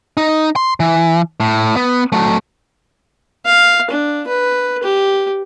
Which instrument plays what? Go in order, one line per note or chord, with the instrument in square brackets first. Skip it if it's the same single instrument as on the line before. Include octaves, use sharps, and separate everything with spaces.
[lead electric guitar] D#4
C6
E3
A2
B3
F#3 A3
[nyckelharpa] F5
D4
B4
G4